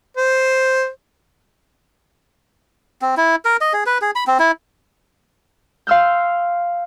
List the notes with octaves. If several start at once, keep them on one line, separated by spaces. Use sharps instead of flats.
C5
C4
E4
A#4
D#5
G#4
B4
G#4
B5
C4
E4
F5 C6 E6 F6 G6